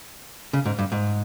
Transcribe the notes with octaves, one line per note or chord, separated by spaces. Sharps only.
C#3
G#2
G2
G#2